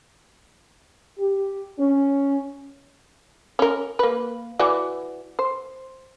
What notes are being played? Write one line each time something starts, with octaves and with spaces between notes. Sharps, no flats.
G4
C#4
C#4 A#4
A#3 B4
E3 F#4 D5
C5